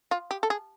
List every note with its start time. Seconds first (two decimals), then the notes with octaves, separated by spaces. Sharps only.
0.11 F4
0.31 G4
0.43 A4
0.50 G#4